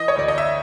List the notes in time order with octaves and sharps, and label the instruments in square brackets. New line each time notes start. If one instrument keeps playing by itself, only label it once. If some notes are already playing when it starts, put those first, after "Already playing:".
Already playing: [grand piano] E3 D#5
C#5
D2 D5
D#5
E5